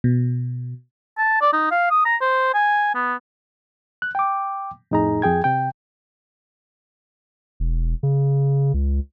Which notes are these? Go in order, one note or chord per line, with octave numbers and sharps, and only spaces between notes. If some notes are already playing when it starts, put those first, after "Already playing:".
B2
A5
D5
D#4
F5
D#6
A#5
C5
G#5
B3
F#6
G5 D6
F2 A2 D#4 G#4 A#5
F2 G#4 G5 G#6
C3 G5
E1
C#3
C#2